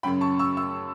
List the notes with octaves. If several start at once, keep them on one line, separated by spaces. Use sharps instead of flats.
F#2 C#3 F#3 C#4 G5 B5
A5 C#6
C#6 E6
C#6 E6